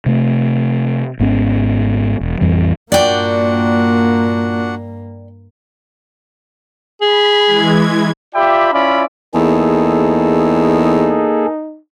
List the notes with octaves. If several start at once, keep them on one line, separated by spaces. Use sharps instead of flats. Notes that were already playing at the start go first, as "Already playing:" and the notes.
C3 A3
G#1 G#2 B3 C#4
E1
A1 F2 E3 G3
G2 A#2 A#3 D4 F#4 D5 F#5 G5
G#4 B5
E3 G#3 G#6
F4 G4 D5 E5 G5 B5
C#4 E4 F4 D5 E5 B5
E2 A#3 D#4 G#4 A4